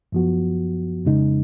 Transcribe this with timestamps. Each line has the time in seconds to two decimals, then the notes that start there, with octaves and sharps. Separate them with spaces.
0.12 F#2 F3 B3 F#4
1.05 F2 C#3 G#3 D#4